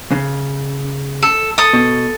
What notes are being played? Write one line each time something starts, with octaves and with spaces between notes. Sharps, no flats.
C#3
A4
A4 D#6
B2